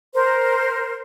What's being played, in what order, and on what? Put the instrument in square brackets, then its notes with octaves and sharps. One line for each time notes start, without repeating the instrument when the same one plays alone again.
[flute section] A#4 C5